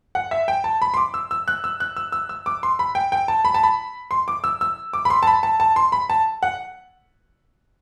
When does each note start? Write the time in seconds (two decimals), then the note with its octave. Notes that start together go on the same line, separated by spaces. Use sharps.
0.15 F#5
0.31 E5
0.48 G5
0.64 A5
0.82 B5
0.94 C6
0.97 D6
1.14 E6
1.31 E6
1.48 F#6
1.64 E6
1.80 F#6
1.97 E6
2.12 E6
2.29 E6
2.46 D6
2.63 C6
2.79 B5
2.95 G5
3.12 G5
3.28 A5
3.45 B5
3.54 A5
3.63 B5
4.11 C6
4.28 D6
4.44 E6
4.61 E6
4.93 D6
5.05 B5
5.10 C6
5.23 A5
5.27 B5
5.43 A5
5.60 A5
5.76 C6
5.92 B5
6.10 A5
6.43 F#5